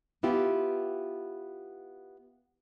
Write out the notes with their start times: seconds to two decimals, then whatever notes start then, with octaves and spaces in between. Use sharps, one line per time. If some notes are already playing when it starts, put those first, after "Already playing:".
0.23 B3 E4 F4 G4